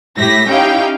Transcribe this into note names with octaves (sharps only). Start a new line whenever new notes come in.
A2 E4 G4 A#6 B6
C#4 D#4 E4 G4 F5 G5